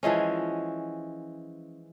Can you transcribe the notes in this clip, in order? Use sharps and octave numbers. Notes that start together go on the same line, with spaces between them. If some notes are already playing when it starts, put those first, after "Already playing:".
E3 F3 G#3 C#4